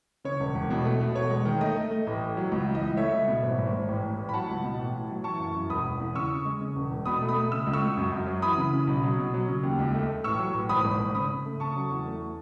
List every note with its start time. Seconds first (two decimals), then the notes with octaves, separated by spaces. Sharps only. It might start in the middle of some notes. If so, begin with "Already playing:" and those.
0.24 C#3 C#5
0.40 E1
0.55 E1
0.70 B2
0.85 A3
1.01 B2
1.15 E1 C#5
1.30 G#3
1.45 D#3
1.61 A3 D#5
1.76 A3
1.91 A3
2.07 A1
2.21 A1
2.37 F#3
2.52 C#2
2.67 E3
2.75 D#5
2.82 C#2
2.97 A3 C#5 E5
3.12 C#2
3.28 B2
3.43 G#1
3.58 G#1
3.73 G#1
3.88 A1
4.03 A2
4.19 A1
4.29 B5
4.33 F#3 F#5 A5
4.49 C#2
4.64 B2
4.79 A1
4.95 A2
5.09 F#3
5.24 E3 A5 C#6
5.40 F#2
5.55 F#2
5.70 E1 B5 D#6
5.85 E1
6.00 E2
6.15 C#3 C#6 E6
6.30 C#3
6.45 G#3
6.61 C#3
6.75 E1
6.90 E1
7.06 B2 B5 D#6
7.21 A3
7.29 B5 D#6
7.36 A3
7.52 C#3 E6
7.67 C#2
7.73 C#6 E6
7.82 C#2
7.97 F#2
8.12 F#2
8.27 F#3
8.42 E3 B5 D#6
8.58 C#3
8.73 C#3
8.87 B1
9.04 F#3
9.18 B2
9.34 F#3
9.48 C#3
9.63 D#2
9.79 C#2
9.94 A3
10.09 A3
10.24 A1 C#6 E6
10.39 F#3
10.54 A1
10.69 G#1 B5 D#6
10.85 G#1
11.00 G#1
11.15 C#3 B5 D#6
11.30 C#3
11.46 A3
11.60 C#3 A5 C#6
11.76 F#3
11.90 E2
12.06 A3